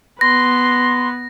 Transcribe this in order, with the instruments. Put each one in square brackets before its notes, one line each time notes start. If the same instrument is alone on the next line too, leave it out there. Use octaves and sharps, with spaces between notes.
[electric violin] B3 B4 [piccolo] C6 [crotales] A#6